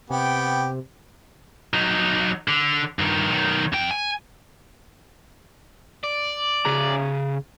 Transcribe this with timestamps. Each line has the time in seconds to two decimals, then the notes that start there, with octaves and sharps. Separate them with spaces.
0.10 C3 B3 G4 G5
1.74 F#3 D#4
2.48 D3
2.99 G2 D#3
3.30 B1 D#3
3.73 F2 G5
3.91 G#5
6.04 D5
6.65 C#3 G#4 A#5